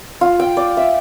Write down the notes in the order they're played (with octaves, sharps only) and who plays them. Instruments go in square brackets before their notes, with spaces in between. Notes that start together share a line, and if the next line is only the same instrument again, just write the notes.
[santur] F4
G5
D5
E5